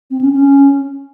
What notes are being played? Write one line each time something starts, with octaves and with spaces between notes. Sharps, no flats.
C4
C#4
C#4